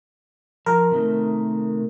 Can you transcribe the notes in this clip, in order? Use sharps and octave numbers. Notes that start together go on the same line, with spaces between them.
F3 A#4
C3 D#3 A3